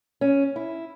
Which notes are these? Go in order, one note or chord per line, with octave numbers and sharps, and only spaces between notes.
C#4
E4